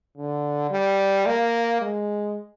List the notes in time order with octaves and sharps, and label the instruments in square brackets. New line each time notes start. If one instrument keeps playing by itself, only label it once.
[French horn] D3
G3
A#3
G#3